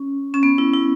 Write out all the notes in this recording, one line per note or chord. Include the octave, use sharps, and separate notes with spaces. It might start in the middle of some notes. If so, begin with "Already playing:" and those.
Already playing: C#4
C#4
B3
E4
E4